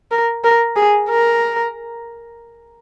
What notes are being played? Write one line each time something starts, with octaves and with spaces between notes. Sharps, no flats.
A#4
A#4
G#4
A#4